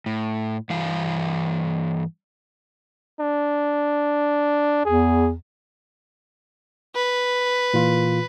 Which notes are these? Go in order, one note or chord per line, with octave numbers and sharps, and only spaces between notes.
A2
G2 E3 F5
D4
E2 G#4
B4
A#2 E3 F4